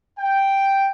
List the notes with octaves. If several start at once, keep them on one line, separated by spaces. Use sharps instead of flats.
G5